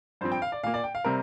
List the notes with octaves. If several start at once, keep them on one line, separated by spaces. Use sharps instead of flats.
G2 F3 C4 C5
G5
F5
D5
A#2 A#3 F5
D5
G5
F5
C3 G3 C4 A#4